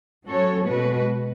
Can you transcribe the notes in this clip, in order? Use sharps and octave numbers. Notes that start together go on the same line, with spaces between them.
F#3 C#4 F#4 A4 C#5
B2 G#3 B3 F#4 B4